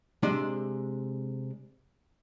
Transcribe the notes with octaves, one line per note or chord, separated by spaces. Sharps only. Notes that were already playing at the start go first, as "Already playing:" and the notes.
C3 G#3 D4 E5